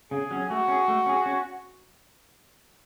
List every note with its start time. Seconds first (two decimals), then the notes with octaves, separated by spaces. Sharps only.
0.11 C#3 G#4
0.31 F#3 C#4
0.50 A3 F#4
0.68 C#4 G#4
0.88 A3
1.06 C#4 G#4
1.26 C#4